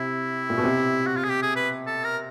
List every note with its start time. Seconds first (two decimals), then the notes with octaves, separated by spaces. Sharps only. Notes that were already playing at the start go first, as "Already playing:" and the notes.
Already playing: C3 E4
0.50 A#2
0.58 B2
0.64 C3
1.07 F#4
1.17 F4
1.24 G#4
1.30 G4
1.42 G#4
1.56 B4
1.87 A4
2.04 A#4